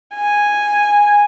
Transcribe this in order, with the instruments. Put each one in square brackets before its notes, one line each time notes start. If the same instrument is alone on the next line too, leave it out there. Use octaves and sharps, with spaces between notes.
[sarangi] G#5